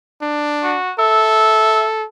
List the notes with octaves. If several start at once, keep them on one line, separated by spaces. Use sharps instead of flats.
D4
F#4
A4 E5